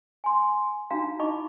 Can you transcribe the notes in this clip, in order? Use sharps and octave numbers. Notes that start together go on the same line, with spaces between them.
G#5 C6
D4 D#4 F4 F#4 F5 A#5
D#4 E4 D#5 B5 C#6 D6